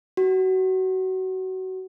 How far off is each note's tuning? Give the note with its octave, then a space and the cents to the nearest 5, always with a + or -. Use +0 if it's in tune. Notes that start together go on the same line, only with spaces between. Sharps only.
F#4 +25